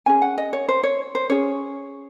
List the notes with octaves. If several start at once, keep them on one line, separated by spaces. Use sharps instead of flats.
C#4 G#4 G#5
F#5
D#5
C#5
C5
C#5
C5
C#4 G#4 C#5